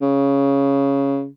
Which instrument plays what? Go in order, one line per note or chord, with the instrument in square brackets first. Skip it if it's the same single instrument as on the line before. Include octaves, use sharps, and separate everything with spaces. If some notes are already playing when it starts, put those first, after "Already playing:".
[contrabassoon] C#3